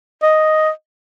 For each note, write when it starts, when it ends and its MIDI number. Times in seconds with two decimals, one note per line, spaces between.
0.22 0.69 75